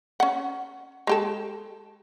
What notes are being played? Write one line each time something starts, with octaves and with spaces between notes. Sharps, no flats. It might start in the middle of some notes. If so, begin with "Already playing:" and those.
C#4 F#5
G#3 G4 A4